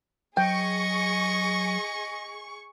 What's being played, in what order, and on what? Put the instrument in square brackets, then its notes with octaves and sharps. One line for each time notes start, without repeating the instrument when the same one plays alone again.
[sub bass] F#3 [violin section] G#4 C#6 [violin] D#5 [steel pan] G5